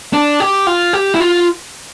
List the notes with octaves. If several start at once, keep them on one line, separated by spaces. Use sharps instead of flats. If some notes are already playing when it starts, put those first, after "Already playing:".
D4
G4
F4
G4
E4
F4